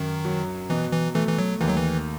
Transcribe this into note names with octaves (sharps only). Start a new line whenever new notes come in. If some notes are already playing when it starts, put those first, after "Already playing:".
Already playing: F#2 D#3
F#3
B2 E3
E3
E3 A3
E3
F#3
D#2 E3
F#3
E3